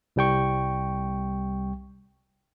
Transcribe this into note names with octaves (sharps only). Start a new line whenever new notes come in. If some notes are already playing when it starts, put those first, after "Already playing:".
C2 G3 G5 C#6